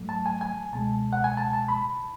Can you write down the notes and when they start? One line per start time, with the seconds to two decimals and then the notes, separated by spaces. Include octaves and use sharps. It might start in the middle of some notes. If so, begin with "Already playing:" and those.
Already playing: G#2 F#3 A3
0.09 A5
0.26 G#5
0.41 G#5
0.73 C#2 B2 G#3 A5
1.13 F#5
1.24 G#5
1.37 A5
1.53 A5
1.69 B5